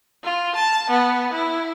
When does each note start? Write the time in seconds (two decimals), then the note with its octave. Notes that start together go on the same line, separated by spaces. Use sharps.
0.24 F4
0.55 A5
0.90 B3
1.32 E4